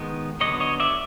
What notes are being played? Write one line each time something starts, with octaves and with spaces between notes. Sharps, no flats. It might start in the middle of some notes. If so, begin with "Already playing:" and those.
Already playing: D#3 G#3 B3
D3 F#3 B3 C#5 D#5
C#5 D#5
D5 E5